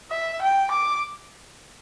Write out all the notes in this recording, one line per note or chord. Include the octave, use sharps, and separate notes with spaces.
E5
G5
D6